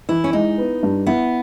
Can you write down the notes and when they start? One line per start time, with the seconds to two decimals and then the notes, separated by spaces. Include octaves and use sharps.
0.09 E3 E4
0.24 C#4
0.33 G#3 D#4
0.58 B3
0.83 G2
1.07 B3 E4